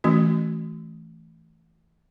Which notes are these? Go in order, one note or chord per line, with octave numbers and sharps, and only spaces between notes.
E3 A3 C#4 F#4